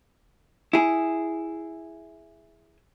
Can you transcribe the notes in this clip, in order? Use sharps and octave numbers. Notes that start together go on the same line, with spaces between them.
E4 G#4